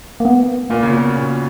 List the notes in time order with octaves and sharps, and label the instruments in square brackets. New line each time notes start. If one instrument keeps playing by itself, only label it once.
[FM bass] A#3
B3
[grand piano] A#2 [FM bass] A#3
[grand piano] C#3
B2
A#2